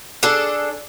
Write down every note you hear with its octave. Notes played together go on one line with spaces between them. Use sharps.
D4 G#4 A4